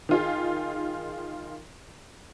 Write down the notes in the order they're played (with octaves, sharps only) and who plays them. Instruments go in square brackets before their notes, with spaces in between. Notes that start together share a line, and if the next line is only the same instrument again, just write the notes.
[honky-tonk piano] D#3 F4 G#4